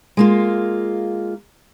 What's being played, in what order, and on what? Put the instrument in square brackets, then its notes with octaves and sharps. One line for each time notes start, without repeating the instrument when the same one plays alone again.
[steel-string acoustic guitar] G#3 A#3 F4